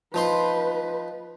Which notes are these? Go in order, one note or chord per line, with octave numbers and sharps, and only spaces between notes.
F3 D#4 B4 C6